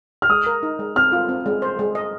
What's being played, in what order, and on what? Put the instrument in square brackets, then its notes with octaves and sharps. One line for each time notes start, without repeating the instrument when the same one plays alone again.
[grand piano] F6
[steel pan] G#3 [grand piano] D#6
[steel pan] A#4
D#4
G#3
[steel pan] C4 [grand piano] F6
[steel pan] F4
C4
G#3
C5
G#3
D#5